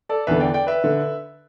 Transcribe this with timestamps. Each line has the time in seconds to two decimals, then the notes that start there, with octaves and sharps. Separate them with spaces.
0.09 A4 D5
0.27 E2 D3 B4 E5
0.40 D5 G5
0.54 D5 G5
0.67 B4 E5
0.84 D3